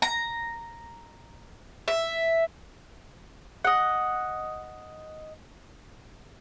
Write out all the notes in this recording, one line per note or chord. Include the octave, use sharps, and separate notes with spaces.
A#5
E5
D#5 F#5